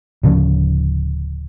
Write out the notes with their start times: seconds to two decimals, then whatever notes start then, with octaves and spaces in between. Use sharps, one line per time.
0.23 D1 C#3 F3 C#4